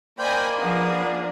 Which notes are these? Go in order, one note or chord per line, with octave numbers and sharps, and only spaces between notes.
A#3 C5 D5 D#5 G5 G#5 B5 G6
F3 B3 D4 G#4 D#6